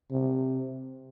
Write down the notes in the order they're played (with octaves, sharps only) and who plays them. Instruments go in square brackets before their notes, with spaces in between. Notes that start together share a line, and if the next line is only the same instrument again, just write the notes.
[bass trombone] C3